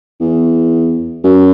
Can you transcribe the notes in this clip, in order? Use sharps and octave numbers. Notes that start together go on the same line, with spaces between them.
E2
F#2